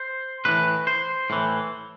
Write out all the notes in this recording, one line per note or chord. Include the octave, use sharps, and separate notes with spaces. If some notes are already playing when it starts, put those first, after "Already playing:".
Already playing: C5
A2 E3 B4
C5
A2 E3